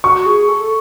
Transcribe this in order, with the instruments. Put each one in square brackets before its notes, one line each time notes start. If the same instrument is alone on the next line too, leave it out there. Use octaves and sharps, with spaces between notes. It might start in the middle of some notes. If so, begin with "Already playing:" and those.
[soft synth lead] F#4 [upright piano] C#6
[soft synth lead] G#4
A4